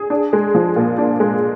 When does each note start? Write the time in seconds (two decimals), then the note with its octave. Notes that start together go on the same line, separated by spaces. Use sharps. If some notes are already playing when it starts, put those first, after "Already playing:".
Already playing: G#4
0.10 D4
0.33 G#3
0.55 F3
0.76 A#2
0.98 D4
1.20 G#3